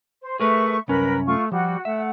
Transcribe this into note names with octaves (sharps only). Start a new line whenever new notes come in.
C5
A3 G#4 A#4 B4 E5 C#6
C2 F#2 C#4 A#4 B4 B5
A3 F4 C#6
F3 G3 F#4
A3 E5 F#5